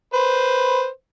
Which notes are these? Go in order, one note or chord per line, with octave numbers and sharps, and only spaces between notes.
B4 C5